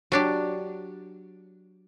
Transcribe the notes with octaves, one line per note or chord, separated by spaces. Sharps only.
F#3 D4 G4